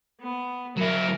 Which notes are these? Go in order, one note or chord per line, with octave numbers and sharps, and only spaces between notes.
B3
F#3 E4 A#4